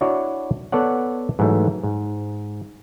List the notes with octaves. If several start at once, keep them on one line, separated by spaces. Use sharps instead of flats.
D4 E4 F#4 C#5 D5
B3 A4 C#5 D5 F#5
G#2 E3 F#3 A3
G#2